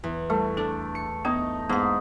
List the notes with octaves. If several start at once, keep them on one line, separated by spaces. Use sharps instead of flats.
E2
G3 A3
D4 A4
C#7
B3 D#4
G#2 A#3 B3 A5